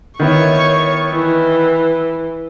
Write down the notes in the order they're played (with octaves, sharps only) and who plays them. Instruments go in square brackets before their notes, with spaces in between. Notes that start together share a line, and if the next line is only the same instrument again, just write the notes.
[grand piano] D#3 B3 E4 [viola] C#5 C#6
[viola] E3